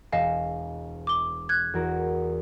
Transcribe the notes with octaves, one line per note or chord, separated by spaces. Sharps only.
E1 D#5 F5 G#5 E7
D6 G7
F#6 G#6
E2 F#4 A#4